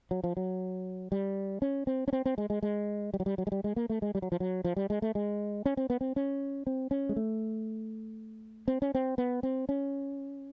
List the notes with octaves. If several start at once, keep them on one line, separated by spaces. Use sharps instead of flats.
F#3
F3
F#3
G3
C#4
C4
C#4
C4
C4
G#3
G#3
G#3
G3
F#3
G3
F#3
G#3
G3
G#3
A#3
A3
G#3
G3
F#3
F3
F#3
F3
G3
G#3
A3
G#3
C#4
C4
B3
C4
C#4
C4
C#4
G#3
A3
C4
C#4
C4
B3
C4
C#4